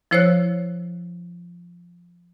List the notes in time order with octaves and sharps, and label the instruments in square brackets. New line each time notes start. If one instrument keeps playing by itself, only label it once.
[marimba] F3 E4 C5 C#5 E6 F#6